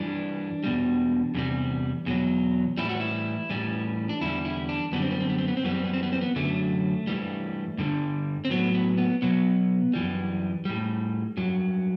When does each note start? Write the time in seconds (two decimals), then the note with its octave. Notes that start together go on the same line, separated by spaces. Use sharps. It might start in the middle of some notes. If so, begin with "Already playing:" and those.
Already playing: G2 E3 G3 D4
0.64 E2 B2 G3
1.35 E2 C3 G3
2.06 E2 B2 F#3
2.77 A2 E3 G3 E4
2.89 F#4
3.00 E4
3.50 A2 E3 G3
4.09 D4
4.21 E2 D3 G3 E4
4.45 E4
4.69 D4
4.92 F#2 D3 G3 B3
5.02 C4
5.11 B3
5.20 C4
5.29 B3
5.38 C4
5.48 B3
5.57 C4
5.64 F#2 E3 G3 B3
5.75 C4
5.84 B3
5.93 C4
6.03 B3
6.13 C4
6.21 B3
6.36 F#2 D3 F#3 A3
7.07 G2 E3 G3
7.78 G2 D3 G3
8.45 C4
8.50 A2 F#3 B3
8.74 B3
8.98 B3
9.22 B2 F#3 B3
9.93 F#2 E3 G3
10.65 A2 G3
11.37 G2 F#3